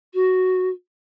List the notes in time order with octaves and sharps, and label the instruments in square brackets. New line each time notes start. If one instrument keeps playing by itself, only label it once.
[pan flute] F#4